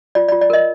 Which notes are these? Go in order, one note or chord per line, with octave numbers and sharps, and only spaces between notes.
F4 D5
F4 D5
D5
A#4 D#5